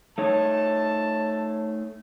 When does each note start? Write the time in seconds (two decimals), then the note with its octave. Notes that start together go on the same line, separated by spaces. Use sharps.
0.18 A3 D#4 C#5 A5